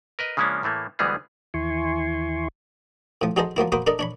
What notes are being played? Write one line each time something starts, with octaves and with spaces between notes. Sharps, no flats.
A#4 B4 D#5
C#3 F3 G#3 A#3 C#4 D4
A2 E3 A3 A#3
D2 E3 G3 G#3 B3 G#4
D#2 E3 E4 G#5 C6 C#6
A2 F3
F#3 D#4 G#4 A4 C5 D#5
F3 F#3 A#3 E4
A#3 F#4 C5 B5 D6 D#6
D4 A4 A#4 D#5
D4 C#5 B5